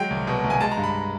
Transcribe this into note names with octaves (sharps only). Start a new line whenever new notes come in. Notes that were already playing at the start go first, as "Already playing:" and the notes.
Already playing: F#3 G#3 G5
C2
B2
C2
G#5
G#3 A5
A#5
G2
B5